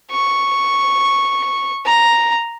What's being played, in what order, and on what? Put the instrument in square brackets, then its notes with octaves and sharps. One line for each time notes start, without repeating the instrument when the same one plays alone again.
[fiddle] C#6
A#5